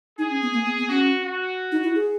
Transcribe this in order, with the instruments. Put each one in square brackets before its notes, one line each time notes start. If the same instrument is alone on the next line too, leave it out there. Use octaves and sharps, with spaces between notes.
[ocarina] D#4 [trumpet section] G#4
[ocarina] C#4
B3
A#3
B3
B3
[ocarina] C#4 [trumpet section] F#4
[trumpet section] F#4
[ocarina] D#4
E4
G#4